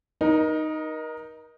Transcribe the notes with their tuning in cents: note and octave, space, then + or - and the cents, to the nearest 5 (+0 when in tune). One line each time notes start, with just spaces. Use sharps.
D#4 +0 A#4 +30